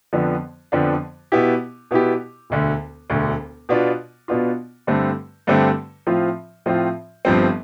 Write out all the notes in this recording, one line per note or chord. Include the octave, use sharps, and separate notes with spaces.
F2 D3 F3 B3 D4
F2 D3 F3 B3 D4
B2 B3 E4 G4
B2 B3 E4 G4
E1 D2 D3
E1 D2 D3
B2 B3 D4 F4
B2 B3 D4 F4
G2 D3 A3 C4
G2 D3 A3 C4
A2 F3 C4 F4
A2 F3 C4 F4
G1 G2 F3 C4